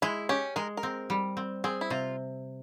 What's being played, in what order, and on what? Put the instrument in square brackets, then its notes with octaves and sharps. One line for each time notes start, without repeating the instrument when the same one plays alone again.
[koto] G#3 [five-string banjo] E4
[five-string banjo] C#4 [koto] G4
[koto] G#3 [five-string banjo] A#4
[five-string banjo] A#4
[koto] C4
G3
C4
[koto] C4 [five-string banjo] G#4
[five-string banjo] E4
[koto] C3 [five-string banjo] F4